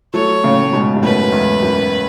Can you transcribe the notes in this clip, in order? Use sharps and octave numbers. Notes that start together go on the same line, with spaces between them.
F#3 A3 C#5
A2 C#3
A2
G#2 B2
B2
F#2 A2 B4
E2 G#2
F#2